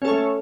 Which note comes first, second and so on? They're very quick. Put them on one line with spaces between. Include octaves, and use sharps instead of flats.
C#4 A4 C#5 A3